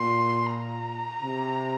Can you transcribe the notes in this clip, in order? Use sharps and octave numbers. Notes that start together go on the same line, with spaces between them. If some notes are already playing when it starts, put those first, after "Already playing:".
Already playing: A#2 C6
A#5
C3